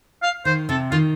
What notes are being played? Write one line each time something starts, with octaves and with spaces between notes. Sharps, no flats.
F5
D#3 C5
C3 A4
D#3 F4